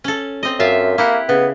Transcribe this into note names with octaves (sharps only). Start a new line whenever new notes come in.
C#4 A4
C4 D#5
F#2 F4 E5 F5
A#3 E4 G4 F#5
C#3 B3